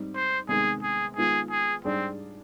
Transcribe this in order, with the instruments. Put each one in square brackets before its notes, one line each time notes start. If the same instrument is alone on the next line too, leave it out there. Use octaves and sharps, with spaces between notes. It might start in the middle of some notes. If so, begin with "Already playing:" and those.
Already playing: [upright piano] G#2 G3 C4 D#4
[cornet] C5
[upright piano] C3 D#3 G#3 B3 [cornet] G#4
[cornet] G#4
[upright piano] D#3 G#3 B3 F4 [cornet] G#4
[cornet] G#4
[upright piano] G#2 G3 D4 G#4 D5 [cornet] C4